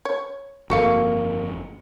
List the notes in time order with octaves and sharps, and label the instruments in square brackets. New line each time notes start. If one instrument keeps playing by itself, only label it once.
[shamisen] C#5
[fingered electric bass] G1 F2 [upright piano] A#3 C#6 C#7 [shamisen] F#4 A4 F5